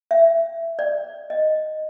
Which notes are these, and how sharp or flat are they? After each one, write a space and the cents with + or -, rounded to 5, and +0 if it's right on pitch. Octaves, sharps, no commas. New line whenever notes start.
E5 +15
D5 +15
D#5 -5